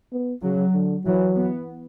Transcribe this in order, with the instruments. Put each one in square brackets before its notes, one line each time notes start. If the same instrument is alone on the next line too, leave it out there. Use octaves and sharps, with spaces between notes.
[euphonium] B3
[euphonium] C#3 [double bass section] F#3
[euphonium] D3
[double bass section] E3 [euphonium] F#3
[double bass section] B3